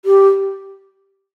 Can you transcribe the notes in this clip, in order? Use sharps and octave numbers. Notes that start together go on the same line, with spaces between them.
G4